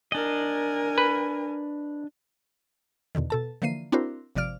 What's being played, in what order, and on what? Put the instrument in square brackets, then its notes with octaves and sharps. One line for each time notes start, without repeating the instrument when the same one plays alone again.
[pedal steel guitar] D4 D#5 [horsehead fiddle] A#4 G#5
[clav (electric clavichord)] B4
[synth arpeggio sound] E2 B2 D3 D#3
B2 A4 A5
D3 E3 F3 A#3 C7 D#7
C4 D4 E4 F#4 A#4 C5
G#1 C3 F3 D5 F6 D7